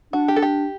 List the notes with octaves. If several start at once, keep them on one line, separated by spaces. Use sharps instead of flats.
D4 F#4
G4
A4
G4